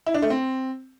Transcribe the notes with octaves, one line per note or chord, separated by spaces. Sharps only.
E4
D4
A3
C4